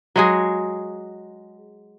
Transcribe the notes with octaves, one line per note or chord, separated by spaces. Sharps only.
F#3 G#3 G#4